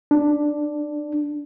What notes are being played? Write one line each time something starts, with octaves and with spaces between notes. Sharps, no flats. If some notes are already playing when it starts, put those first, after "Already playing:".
D4